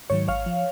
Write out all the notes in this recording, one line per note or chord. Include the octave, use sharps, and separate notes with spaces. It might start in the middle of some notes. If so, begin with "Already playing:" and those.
G#2 D#3 F#3 C#5
G#1 C#5 F5
F3